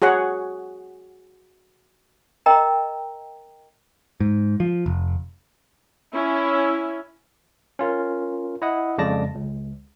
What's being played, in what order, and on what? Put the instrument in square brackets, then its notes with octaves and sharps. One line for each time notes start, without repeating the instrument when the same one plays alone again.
[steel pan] F#4 G#4 C#5 F#5
[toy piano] A#4 D#5 G5 A#5
[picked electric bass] G#2
F3
F1
[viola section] C#4 E4
[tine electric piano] C#4 F4 A#4
E4 D#5 F#5 D#6
F2 C#3 G#3 D5 A5 A#6
C#2